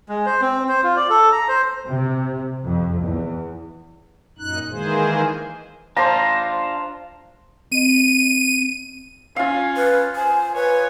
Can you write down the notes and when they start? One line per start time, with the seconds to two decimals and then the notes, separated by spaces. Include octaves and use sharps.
0.09 G#3
0.26 C5
0.41 C4
0.69 C5
0.84 F4
0.96 D5
1.10 A4
1.32 A#5
1.48 C5
1.87 C3
2.65 F2
3.03 E2
4.38 F#2 A#2 D#4 F#6
4.70 D#3 E3 G#3 A#3 G#4 C5
5.97 D4 F4 C5 A5 A#5
7.72 C4 D#5 D#7
9.36 C#4 F4 F5
9.77 B4
10.16 C5 G#5
10.55 B4 C#5 G#5